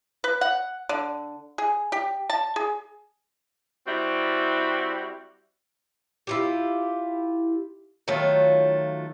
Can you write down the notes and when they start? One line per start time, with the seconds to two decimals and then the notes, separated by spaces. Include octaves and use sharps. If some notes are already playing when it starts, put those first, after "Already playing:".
0.24 B4
0.41 F#5
0.89 D3
1.58 G#4
1.92 G4
2.30 A5
2.56 G#4
3.87 G3 C4 E4 F#4
6.27 E4 F4 G4
8.08 D#3 F#3 A3 F4